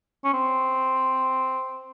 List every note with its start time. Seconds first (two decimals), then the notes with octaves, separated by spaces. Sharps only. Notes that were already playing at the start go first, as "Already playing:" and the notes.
0.25 C#4
0.34 C4